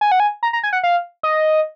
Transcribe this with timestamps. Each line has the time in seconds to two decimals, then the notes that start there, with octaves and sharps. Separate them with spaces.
0.01 G#5
0.12 F#5
0.20 G#5
0.43 A#5
0.53 A#5
0.63 G#5
0.73 F#5
0.83 F5
1.23 D#5